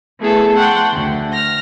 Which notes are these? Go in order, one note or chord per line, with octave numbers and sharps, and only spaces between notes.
A3 B3 E4 G#4 A4
F#5 G5 A5 C6 C#6
D2
F6 A#6